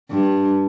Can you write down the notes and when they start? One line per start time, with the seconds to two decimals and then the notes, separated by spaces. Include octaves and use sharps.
0.10 G2